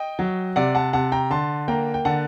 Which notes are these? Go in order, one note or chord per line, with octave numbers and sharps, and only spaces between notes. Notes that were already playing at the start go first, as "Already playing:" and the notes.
Already playing: D#5 G5
F#3
C3 D5 F#5
F#5 A5
C3 F#5 A5
G5 A#5
D3 A5 C6
A#3 G5 A#5
G5
D3 F#5 A5